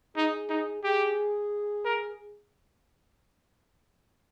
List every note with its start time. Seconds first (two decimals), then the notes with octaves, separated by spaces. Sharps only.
0.16 D#4 G#4
0.50 D#4
0.84 G4 G#4
1.85 A#4